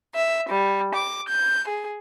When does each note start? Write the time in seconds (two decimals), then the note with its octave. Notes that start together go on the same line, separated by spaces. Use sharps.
0.15 E5
0.48 G3
0.93 D6
1.28 G6
1.68 G#4